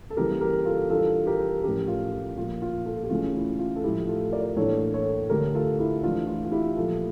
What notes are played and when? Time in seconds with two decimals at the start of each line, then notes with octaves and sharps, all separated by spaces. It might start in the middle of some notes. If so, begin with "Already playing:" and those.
0.10 A4
0.17 C#3 E3 G3 A#3 G4 A#4
0.41 G4 A#4
0.65 F4 A4
0.90 E3 G3 D4 F4 A4
1.27 G4 A#4
1.63 A2 F3 C#4 G4 A#4
1.88 F4
2.13 F4
2.38 A#2 F3 A#3 F4
2.62 F4
2.86 F4 A4
3.03 G4
3.10 C#3 E3 A3 C#4 F4
3.35 E4
3.59 F4
3.76 A4
3.84 A2 F3 A3 E4 G4
4.07 F4 A4
4.32 A#4 D5
4.56 A2 E3 A#3 D4 A4 C#5
4.94 A4 C#5
5.30 D3 A3 D4 G4 A#4
5.55 F4 A4
5.79 E4 G4
6.03 E3 A3 D4 F4
6.28 F4
6.45 F4
6.52 E4 G4
6.77 A#2 F3 A3 F4 A4